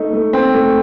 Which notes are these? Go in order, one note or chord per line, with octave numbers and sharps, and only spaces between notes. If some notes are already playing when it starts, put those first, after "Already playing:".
Already playing: A3 D#4
A3
C4
A3